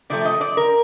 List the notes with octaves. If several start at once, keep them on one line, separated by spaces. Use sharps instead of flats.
C3 F3 A3 D5
D#5
D5
A#4